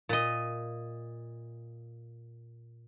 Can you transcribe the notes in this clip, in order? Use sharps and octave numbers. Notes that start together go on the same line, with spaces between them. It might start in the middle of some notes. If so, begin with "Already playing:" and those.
A#2 D#5